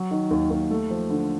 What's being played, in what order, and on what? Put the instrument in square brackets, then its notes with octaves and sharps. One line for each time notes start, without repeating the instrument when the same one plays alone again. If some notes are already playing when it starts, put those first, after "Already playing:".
Already playing: [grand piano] F#3
D#3
D#2
D#2
A3
F3
D3